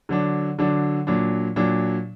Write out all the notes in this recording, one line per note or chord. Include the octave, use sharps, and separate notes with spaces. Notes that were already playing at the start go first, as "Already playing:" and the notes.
D3 F#3 D4
D3 F#3 D4
A#2 F#3 D4
A#2 F#3 D4